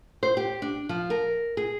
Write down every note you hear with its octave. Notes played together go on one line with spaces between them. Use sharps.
C5
G4
D4
F3
A#4
G#4